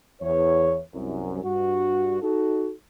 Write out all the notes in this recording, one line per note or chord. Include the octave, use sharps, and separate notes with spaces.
E2 C#5
C2 F#2
G2 F#4
D#4 F#4 A4